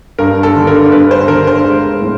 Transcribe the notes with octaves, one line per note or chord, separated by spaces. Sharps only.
G2 A#4
A4
D3
A#4
G2 B4
C5
D3 A#4
C5
G#3
A2